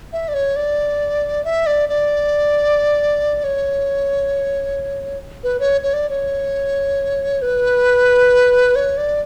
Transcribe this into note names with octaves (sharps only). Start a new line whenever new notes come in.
E5
D5
C#5
D5
E5
D5
D5
C#5
B4
C#5
C#5
D5
C#5
B4
C#5
D5